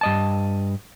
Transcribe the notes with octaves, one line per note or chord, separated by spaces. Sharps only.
G2 D#5 A5